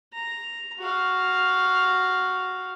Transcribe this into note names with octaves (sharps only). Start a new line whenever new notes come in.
A#5
F#4 F5